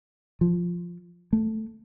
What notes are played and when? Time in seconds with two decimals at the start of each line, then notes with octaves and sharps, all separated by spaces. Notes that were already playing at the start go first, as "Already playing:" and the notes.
0.41 F3
1.33 A3